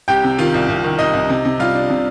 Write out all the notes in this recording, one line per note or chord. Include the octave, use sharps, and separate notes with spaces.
C2 G4 G5
C3
D#3 F4 F5
C2
C2
D#3
C2 D#4 D#5
C2
C3
C3
G3 F4 F5
D4
C3